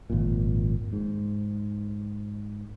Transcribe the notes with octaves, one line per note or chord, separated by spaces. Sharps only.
G#1 F2 A#2
G#2